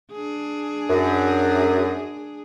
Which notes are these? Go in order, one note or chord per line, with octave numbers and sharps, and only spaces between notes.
D4 G#4
F#2